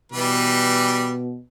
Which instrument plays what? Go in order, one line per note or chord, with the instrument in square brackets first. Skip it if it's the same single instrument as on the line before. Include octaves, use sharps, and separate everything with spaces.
[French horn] B2 [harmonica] E3 G3 B4